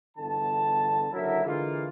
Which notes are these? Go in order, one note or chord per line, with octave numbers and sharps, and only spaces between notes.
G1 E2 D3 A5
F#1 D3 F#3 E4 A#4 E5
D3 E3 G#3 A#3 F4